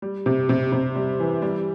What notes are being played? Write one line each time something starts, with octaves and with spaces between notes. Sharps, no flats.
G3
C3
C3
C3
G3
E3
G3